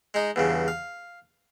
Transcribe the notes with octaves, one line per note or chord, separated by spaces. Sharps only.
G#3 D#4
E2 G2 C#3
F5